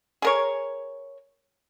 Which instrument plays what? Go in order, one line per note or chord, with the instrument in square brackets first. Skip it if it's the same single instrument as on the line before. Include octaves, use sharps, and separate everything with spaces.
[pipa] G#4 A#4 C#5